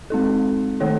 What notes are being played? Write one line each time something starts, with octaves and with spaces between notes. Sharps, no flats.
G#3 C4 D#4 A4
D#3 A3 D#4 A4 C#5